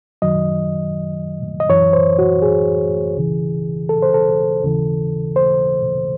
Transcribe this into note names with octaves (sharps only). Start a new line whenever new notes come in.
F#2 D#3 F#3 D#5
D#5
F#2 E3 C#5
C5
F#4
G#4
C#2 C#3 E3
A4
C5
A4
D#2 C#3 E3
C5